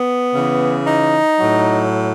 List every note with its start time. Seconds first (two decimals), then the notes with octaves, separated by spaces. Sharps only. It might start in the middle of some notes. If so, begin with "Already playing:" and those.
Already playing: B3
0.34 C#3 E3
0.87 D#4
1.39 A2 F#3